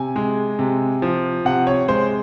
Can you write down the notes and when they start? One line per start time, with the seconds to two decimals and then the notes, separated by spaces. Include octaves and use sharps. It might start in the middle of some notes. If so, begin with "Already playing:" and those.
Already playing: C3 G#5
0.16 G#3
0.59 C3
1.02 F3
1.45 C3 F#5
1.67 C#5
1.88 G#3 C5